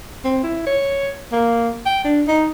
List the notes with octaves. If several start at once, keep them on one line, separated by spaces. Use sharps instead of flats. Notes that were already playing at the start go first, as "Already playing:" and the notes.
C4
E4
C#5
A#3
G5
D4
D#4